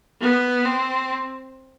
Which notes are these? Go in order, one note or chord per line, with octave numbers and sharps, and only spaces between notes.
B3
C4